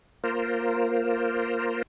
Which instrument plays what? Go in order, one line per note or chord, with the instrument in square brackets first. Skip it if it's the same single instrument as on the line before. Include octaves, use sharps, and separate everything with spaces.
[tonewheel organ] A#3 F4 A#4 C5